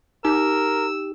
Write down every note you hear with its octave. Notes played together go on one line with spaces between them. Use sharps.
D#4 G4 A#4 E6